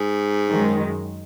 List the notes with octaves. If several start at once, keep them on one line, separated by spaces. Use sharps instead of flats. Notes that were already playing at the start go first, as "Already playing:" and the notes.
Already playing: G#2
F#2 D#3 G#3